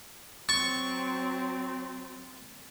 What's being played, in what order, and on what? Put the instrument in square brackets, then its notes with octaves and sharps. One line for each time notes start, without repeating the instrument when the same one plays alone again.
[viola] F#3 C4 [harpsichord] C#6 [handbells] A6